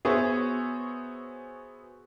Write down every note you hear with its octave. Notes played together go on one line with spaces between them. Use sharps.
B3 F#4 G#4 C5 C#5 E5